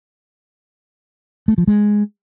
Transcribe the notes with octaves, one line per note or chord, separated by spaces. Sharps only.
A3
F3
G#3